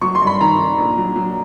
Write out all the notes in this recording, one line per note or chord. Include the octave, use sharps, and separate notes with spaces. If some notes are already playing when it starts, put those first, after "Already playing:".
F#3 C#6
C6
G2
B5
D#3 A#5
D#3
A#1
F#3
F#3